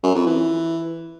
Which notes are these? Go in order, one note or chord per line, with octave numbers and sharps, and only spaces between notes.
F#2
F2
E3